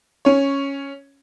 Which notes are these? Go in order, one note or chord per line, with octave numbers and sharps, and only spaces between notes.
C#4 C#5